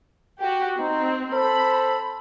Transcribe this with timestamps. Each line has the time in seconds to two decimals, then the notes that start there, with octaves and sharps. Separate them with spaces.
0.40 F#4 G4
0.80 C4 D#4
1.33 A4 C5 B5